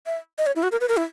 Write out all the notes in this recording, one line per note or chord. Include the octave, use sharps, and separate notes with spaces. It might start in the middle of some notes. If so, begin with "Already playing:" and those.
E5
D#5
C#5
E4
F#4
A#4
B4
A#4
E4